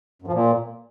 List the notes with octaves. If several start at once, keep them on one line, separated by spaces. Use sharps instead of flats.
F#2
F3
A#2